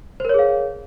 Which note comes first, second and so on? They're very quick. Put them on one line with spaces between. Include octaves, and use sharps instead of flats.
C5 A#4 C#5 G#4 F5